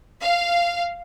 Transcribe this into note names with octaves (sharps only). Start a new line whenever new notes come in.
F5